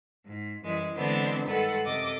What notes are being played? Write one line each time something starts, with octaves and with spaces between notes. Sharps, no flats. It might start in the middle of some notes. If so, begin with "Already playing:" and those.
G#2
F#2 E3 G3 G#3
D3 E3 G#3 B3 C4 D4
G2 D#3 G#3 A4 B4 F#5
F#2 C3 A4 D#5 D6